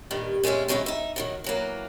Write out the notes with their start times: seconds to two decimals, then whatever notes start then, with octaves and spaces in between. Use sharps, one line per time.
0.11 G2 A#2 D#3
0.43 A#2 G#3 C4 C#4 E5
0.68 D#3 F#3 G#3 C4 C#4 E4
0.86 D#4 E5
1.16 D#3 F3 F#3
1.44 E3 F#3 A#3